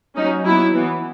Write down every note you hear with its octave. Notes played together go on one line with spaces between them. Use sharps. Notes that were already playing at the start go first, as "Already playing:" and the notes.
F#3 C#4 D#4
F#3 B3 E4
E3 B3